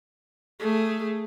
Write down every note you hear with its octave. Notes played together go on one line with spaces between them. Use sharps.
A3 G#4